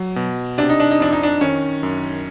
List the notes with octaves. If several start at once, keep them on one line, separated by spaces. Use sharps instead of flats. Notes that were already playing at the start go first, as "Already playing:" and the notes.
Already playing: F#3
B2
C3 D4
D#4
D4
D#4
F2 D4
D#4
D4
D#3 C#4
F#2